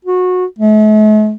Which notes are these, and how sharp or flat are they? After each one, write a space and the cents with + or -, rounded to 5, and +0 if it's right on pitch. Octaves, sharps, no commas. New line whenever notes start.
F#4 -20
A3 -45